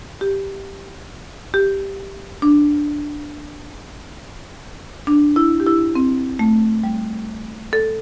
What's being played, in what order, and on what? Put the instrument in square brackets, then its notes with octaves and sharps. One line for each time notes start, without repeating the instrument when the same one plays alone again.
[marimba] G4
G4
D4
D4
E4
G4
E4
C4
A3
G3
A4